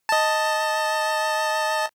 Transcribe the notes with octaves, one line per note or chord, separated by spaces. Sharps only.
D#5 A5